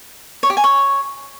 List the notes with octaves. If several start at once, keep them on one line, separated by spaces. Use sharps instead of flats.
C#5
G4
G#5
C#5